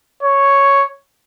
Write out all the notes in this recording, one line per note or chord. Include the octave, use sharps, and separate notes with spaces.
C#5